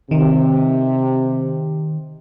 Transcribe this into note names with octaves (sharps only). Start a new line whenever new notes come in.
C3 D#3